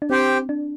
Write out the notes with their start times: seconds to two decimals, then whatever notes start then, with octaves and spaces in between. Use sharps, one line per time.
0.02 D4
0.10 C4 G4 C5 G5
0.49 D4